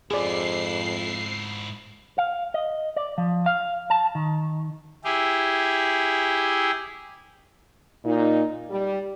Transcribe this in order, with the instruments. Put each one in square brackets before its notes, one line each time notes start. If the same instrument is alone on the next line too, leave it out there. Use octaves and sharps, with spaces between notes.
[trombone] F2 [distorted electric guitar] G#2 E4 [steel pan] G#4 D5 [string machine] C7
[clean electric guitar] F5
D#5
D5
F3
F5
A5
D#3
[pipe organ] E4 G4 G#4
[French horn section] A#2 D#4
G3